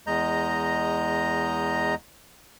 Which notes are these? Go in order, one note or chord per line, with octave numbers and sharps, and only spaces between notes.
E2 G#3 D#5 A#5 G6